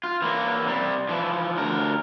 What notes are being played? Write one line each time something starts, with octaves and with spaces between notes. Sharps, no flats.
F4
E3 A#3
C3 G3
E3 F3
D2 A#4